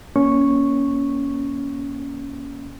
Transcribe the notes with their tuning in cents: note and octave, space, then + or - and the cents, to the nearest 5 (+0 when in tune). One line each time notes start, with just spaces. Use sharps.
A#3 +30 C#4 +15 C#6 -5